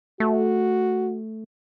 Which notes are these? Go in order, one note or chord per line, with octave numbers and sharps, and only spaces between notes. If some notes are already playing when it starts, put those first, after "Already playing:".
A3 F#4